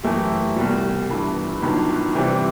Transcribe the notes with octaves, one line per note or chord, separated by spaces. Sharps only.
F#2 E3 A3 E4 G4
C2 B2 G3
G1 G2 E3
G1 G2 D#3 F#3
C3 E3 G3 C4